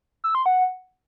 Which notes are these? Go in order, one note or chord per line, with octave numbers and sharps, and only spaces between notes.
E6
C6
F#5